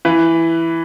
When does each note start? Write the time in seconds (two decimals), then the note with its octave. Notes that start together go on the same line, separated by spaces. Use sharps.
0.05 E3 B4